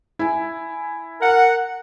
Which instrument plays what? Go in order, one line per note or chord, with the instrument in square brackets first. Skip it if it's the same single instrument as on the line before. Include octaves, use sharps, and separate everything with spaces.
[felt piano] E4 G#5
[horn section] A#4 F#5